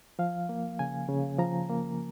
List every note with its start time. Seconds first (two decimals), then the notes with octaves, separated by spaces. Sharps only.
0.19 F3 F5
0.49 A#3
0.79 C#3 G#5
1.09 C#3
1.39 F3 A#5
1.70 A#3